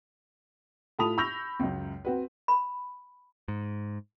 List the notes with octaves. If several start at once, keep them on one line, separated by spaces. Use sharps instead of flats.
A2 F4 A5 B5 D#6 F7
B5 C#6 E6 G6 A#6 F7
C#2 F#2
C4 F#4 B4
B5
G#2